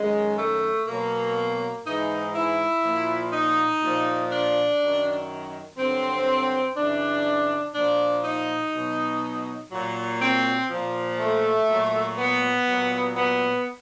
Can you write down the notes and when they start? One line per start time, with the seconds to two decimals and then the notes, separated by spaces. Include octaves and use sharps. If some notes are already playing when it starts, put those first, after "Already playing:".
Already playing: F#2 D#3 F#3 G#3
0.37 A3
0.87 B2 F#3 A#3
1.85 G#2 E3 D#4
2.35 E4
2.84 A#2 F3
3.33 D#4
3.83 A#2 F3
4.30 D4
4.80 F#2 D#3 F#3
5.78 G2 D3 F#3 C4
6.77 F#2 C#3 E3 D4
7.75 A#2 F3 D4
8.24 D#4
8.74 B2 F#3
9.72 A#2 F#3
10.22 C4
10.71 A#2 F3
11.19 A3
11.68 A#2 F#3
12.18 B3
12.67 A#2 F#3
13.16 B3